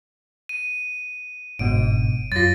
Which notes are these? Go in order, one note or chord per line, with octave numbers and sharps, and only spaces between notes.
D#7
G1 G#2 B2 D7
F#2 F4 A6 A#6